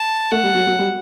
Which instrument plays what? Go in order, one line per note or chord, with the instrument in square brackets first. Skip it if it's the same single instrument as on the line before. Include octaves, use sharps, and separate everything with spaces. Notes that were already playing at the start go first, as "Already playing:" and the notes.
Already playing: [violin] A5
[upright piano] A3 [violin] F#5
[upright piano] G3
F#3
F#3
G3